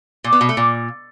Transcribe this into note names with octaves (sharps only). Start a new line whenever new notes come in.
A#2
B3
B2
A3
A#2